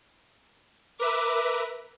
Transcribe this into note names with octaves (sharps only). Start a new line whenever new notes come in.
A#4 B4 E5 D6